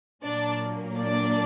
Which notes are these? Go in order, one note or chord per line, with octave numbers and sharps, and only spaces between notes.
A#2 F#3 A#3 D4 D5
D4 D5